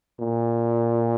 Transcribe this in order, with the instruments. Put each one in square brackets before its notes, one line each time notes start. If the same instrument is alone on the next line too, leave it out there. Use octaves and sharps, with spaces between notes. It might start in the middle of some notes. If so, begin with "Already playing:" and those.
[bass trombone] A#2